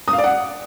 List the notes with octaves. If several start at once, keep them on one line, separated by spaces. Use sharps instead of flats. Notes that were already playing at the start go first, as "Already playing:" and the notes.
D#6
F5
D5
F#5